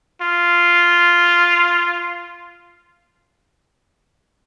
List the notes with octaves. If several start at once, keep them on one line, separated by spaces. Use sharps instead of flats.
F4